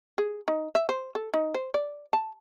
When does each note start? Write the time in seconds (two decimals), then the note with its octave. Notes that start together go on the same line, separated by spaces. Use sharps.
0.18 G#4
0.48 D#4
0.75 E5
0.89 C5
1.15 A4
1.34 D#4
1.54 C5
1.74 D5
2.13 A5